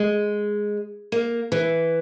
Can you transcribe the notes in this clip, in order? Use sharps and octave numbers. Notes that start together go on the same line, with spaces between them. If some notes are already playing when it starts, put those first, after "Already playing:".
Already playing: G#3
A#3
E3